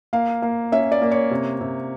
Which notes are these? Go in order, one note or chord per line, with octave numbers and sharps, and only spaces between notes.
A#3 F5
A#3
C#4 E5
D5
A#3
C#5
C3
C3